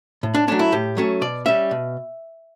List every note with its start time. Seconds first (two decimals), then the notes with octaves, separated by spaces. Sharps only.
0.23 A2
0.35 D4
0.48 F#3 A3 C#4 D4
0.59 E4
0.72 A2 G4
0.97 F#3 A3 C#4
1.21 B2 D5
1.46 G3 C#4 E5
1.71 B2